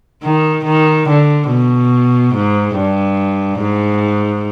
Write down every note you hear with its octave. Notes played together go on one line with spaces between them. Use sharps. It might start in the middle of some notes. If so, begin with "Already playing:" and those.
D#3
D#3
D3
B2
G#2
G2
G#2